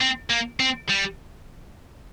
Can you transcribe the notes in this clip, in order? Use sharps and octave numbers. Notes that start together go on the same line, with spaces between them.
C4
A#3
C4
G3